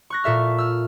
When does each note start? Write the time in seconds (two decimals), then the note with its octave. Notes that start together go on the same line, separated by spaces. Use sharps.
0.10 C#6 F#6 A#6
0.24 A#2 A4 E5 F6
0.58 E6 F6